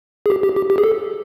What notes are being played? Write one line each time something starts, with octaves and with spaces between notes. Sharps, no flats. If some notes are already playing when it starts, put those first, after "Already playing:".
G#4
G4
G4
G4
G4
G#4
A4